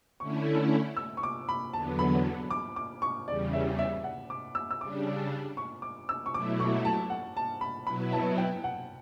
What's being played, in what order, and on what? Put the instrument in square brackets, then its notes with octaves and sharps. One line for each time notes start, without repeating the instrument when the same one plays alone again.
[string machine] D3 A3 C#4 E4 [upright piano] C#6
[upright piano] E6
C#6
D6
B5
[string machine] E2 D3 F#3 B3 [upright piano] A5
[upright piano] B5
D6
D6
C#6
[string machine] E2 C#3 G3 [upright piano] D5
[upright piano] E5
E5
F#5
D6
E6
E6
[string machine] C#3 G3 D4 [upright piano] D6
[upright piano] C#6
D6
E6
C#6
[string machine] B2 F#3 A3 E4 [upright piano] D6
[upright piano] C#6
A5
F#5
A5
B5
[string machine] B2 F#3 B3 E4 [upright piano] B5
[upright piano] A5
G5
F#5